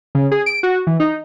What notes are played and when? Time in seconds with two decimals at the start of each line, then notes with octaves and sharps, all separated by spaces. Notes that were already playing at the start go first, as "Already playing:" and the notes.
0.15 C#3
0.31 G#4
0.46 D7
0.63 F#4
0.87 E3
1.00 D#4